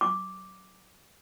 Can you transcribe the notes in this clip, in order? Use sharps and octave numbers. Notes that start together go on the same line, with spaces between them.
D6